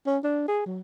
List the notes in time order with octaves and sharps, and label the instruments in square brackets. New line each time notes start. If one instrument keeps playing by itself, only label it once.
[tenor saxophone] C#4
D4
G#4
F#3